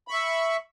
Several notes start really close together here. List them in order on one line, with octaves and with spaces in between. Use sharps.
B5 C#6 E5